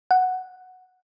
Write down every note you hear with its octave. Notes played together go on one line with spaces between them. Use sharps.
F#5